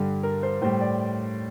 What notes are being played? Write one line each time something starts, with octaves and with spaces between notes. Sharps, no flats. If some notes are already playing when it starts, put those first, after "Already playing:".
Already playing: G2 D3 G3
A#4
C5
A2 G3 C5
D5